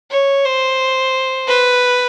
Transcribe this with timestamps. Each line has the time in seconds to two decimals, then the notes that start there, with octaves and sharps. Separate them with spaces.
0.11 C#5
0.45 C5
1.48 B4